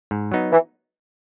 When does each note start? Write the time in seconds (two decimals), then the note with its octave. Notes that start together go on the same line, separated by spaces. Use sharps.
0.11 G#2
0.32 F#3 B3 D#4
0.52 E3